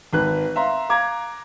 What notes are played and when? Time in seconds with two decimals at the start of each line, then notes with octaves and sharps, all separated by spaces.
0.13 G#1 B4 F#6
0.56 E5 F5 A#5 C6
0.89 F5 A#5 D6 G#6